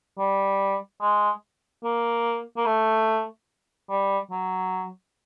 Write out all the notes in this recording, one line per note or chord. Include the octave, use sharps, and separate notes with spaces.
G3
G#3
A#3
A#3
A3
G3
F#3